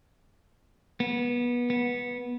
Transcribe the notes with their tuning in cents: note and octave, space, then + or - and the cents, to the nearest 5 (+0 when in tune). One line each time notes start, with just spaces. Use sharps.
B3 -25
B3 -15